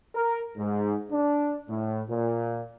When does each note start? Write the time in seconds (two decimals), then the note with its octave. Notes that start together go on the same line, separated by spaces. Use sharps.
0.15 A#4
0.57 G#2
1.10 D4
1.68 A2
2.08 A#2